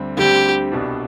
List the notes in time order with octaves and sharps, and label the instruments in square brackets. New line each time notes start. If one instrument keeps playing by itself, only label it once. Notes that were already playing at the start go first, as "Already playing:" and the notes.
Already playing: [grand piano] D2 D3 G3 C4
[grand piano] D2 D3 G3 C4 [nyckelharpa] G4
[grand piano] C2 B2 B3 D4